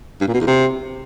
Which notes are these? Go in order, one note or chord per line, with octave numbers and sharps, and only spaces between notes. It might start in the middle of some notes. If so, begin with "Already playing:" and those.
G2
A#2
B2
E2
C3